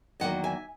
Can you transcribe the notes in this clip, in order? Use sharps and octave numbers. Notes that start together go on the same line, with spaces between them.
E2 D#3 F#3 A#3 D#5 F#5
E5 G#5